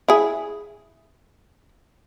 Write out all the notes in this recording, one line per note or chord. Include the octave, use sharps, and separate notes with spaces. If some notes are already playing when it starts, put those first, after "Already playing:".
E4 G#4